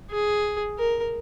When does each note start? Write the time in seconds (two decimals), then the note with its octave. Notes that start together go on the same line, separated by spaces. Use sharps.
0.10 G#4
0.79 A#4